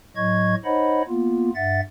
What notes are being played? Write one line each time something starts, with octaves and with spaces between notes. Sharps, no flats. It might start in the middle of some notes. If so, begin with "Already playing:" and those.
A2 F#3 D#5 C#6 G#6
D#4 C5 C#5 D#5 F#5 B5
A#3 B3 F4
G2 E5 F#5 A6